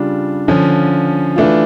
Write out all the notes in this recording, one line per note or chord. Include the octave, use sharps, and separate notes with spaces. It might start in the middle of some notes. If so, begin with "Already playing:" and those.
Already playing: C#3 G3 D4 F4
D3 F3 C#4
E3 A3 D4 F4